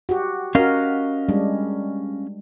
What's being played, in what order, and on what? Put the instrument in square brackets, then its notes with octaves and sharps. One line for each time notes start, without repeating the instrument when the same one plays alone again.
[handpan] F#4 G4
[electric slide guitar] C#4 D#5 F5 [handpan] F#4 A#4
[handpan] G3 G#3 D4